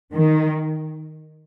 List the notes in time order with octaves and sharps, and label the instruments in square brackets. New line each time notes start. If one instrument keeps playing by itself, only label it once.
[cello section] D#3